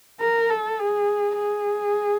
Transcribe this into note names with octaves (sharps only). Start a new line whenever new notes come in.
A#4
A4
G#4
G#4